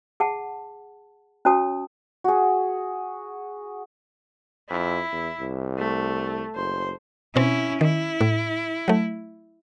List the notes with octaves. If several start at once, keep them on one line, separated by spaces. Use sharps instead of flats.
G#4 F#5 A5
C#4 F#4 C#5 A5 D#6
F#4 G#4
F2 E4
E2
C2
A3
F#1 C5
B2 C4 C#4 E4
D#3 E4
A2
F#3 A3